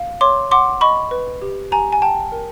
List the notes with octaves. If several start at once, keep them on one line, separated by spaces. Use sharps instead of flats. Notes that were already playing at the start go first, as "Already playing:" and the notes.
Already playing: F5
C#5 C6 D6
F#5 C6 D6
D#5 B5 C#6
B4
G4
G4 G#5 A#5
G#5
G5 A5
A#4